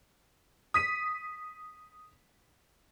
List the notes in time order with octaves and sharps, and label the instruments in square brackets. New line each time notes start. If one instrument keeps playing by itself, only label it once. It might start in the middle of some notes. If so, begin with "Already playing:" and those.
[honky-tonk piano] D#6 B6 D#7